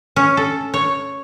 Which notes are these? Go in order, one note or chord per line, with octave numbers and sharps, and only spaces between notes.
C#4
A4
C#5